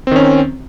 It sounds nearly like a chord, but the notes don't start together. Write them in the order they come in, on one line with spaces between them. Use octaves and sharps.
C4 D#3 C#4